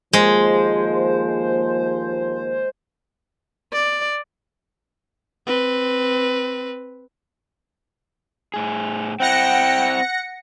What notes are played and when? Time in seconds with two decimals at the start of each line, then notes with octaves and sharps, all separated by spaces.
0.13 D#2 F3 G#3 A#3 C5
3.73 D5
5.47 C4 B4
8.54 A2 G#4
9.20 C4 E4 F#5 G5 A#6 C#7